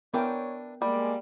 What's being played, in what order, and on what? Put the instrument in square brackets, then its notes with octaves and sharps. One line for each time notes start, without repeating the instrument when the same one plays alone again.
[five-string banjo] E3 D4 [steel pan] B3 A#4 G5 [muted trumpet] C#5
[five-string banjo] G3 [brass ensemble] G#3 A#3 [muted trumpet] D5